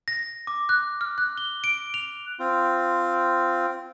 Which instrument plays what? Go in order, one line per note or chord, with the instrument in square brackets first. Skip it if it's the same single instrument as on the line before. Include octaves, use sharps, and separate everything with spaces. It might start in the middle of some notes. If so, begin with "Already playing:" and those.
[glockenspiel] A#6
D6
F#6
F6
F#6
G7
D7
F7
[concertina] C4 F4